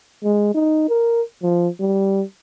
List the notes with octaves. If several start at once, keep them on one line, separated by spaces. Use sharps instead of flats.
G#3
D#4
A#4
F3
G3